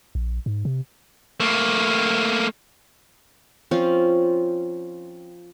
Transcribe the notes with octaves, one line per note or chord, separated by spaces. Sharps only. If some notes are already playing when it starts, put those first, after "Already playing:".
A#1
G#2
C3
A3 A#3
F3 C4 C#4 F4